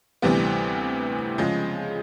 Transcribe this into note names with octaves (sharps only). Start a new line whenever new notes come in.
D2 C3 E3 G3 B3
C#3 F3 G#3